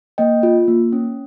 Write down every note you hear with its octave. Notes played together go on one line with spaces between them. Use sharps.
A#3 D#5 G5
F4
A#3
C#4